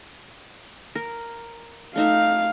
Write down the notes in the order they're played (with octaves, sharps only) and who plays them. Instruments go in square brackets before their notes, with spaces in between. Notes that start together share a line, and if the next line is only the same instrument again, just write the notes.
[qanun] A#4
[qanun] A3 D#4 E5 [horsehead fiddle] F5